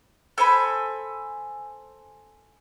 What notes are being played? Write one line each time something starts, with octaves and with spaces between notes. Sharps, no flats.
A4 C5 G#5 B5